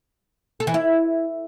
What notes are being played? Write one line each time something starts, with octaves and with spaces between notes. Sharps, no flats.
A4
E3
E4